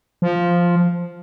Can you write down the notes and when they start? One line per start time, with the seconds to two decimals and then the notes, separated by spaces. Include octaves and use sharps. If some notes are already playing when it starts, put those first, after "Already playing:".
0.22 F3